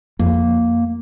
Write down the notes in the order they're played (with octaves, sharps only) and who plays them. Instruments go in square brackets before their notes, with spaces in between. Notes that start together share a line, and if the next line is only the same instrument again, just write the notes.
[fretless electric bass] F2 [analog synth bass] A#3